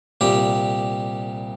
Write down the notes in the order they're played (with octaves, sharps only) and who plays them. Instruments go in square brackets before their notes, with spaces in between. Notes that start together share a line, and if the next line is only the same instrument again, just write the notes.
[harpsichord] C2 A#2 G3 G4